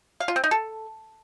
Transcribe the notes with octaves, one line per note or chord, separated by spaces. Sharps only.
F5
F4
C4
D#4
A4